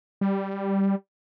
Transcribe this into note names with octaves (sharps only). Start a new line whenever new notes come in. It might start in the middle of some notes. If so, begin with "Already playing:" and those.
G3